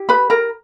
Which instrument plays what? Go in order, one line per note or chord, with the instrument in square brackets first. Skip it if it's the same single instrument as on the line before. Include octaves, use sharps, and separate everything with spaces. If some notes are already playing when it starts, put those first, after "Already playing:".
Already playing: [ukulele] E4 G4
B4 B5
A#4 A#5